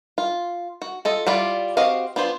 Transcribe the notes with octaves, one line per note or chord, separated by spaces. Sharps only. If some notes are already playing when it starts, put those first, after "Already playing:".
F4
F#4
F4 A4 D#5
G3 E4 F4 D5
C4 F#4 G4 D#5 F5
B3 D4 F4 C5